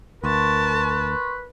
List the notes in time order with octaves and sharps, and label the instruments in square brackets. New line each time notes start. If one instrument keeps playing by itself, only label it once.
[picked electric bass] D2 [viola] A#4 A5 [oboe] B4 [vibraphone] C6 C#6